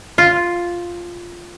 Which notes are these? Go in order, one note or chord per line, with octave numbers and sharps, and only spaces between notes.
F4